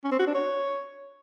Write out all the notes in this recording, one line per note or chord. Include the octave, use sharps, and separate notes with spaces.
C#4
C4
F#4
D4
C#5